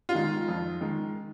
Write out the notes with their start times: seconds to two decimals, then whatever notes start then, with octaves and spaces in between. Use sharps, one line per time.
0.09 F4
0.15 D#3 G#3
0.48 F2
0.81 D#3 G#3